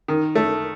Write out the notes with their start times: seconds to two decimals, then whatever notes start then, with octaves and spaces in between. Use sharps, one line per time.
0.08 D#3
0.35 A3